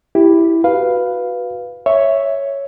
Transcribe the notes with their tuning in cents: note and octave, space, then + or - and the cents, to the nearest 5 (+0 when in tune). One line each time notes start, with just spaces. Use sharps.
E4 +0 G4 +0
F#4 +0 B4 +0 F5 +0
C#5 +0 E5 +0